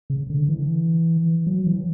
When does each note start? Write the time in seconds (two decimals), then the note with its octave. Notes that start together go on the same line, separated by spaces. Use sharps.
0.10 C#3
0.30 D3
0.49 E3
1.47 F#3
1.67 E3